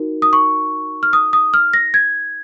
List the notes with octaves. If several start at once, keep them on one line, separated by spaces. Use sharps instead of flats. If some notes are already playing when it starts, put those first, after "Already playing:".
Already playing: D#4 F#4 A#4
D#6
C#6
F6
D#6
D#6
F6
A#6
G#6